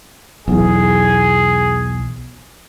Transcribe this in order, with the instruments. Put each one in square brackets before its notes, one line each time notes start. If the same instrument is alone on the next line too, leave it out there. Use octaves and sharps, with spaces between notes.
[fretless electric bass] B1 E2 [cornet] G#4